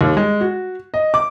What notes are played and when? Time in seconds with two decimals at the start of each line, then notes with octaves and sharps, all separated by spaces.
0.01 D#2
0.17 G#3
0.41 F#4
0.94 D#5
1.14 D6